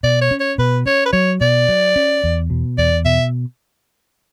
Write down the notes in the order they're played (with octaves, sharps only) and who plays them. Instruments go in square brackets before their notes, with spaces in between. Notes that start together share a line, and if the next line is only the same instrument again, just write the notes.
[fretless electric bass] B2 [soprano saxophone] D5
[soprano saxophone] C#5
[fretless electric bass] C#4
[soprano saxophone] C#5
[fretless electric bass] B2 [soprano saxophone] B4
[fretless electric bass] C#4 [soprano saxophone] C#5
[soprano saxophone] B4
[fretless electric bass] F#3 [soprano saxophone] C#5
[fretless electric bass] B2 [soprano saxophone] D5
[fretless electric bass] F#3
C#4
E2
B2
[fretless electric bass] E2 [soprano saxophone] D5
[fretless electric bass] B2 [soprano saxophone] E5